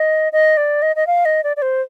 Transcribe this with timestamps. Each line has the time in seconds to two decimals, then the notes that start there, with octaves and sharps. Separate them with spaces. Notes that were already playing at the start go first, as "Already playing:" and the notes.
Already playing: D#5
0.33 D#5
0.57 D5
0.82 D#5
0.96 D#5
1.07 F5
1.25 D#5
1.44 D5
1.57 D5
1.62 C5